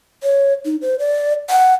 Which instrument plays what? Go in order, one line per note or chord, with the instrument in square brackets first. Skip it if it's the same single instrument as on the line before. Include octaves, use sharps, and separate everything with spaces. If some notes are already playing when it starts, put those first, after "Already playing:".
[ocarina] C#5
D#4
C5
D5
F#5